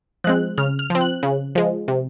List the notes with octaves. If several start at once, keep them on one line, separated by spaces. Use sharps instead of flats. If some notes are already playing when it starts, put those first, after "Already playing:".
F3 G#3 C4 F#6
C#3 F6
F6
F3 C4
F#6
C#3
F3 G#3
C3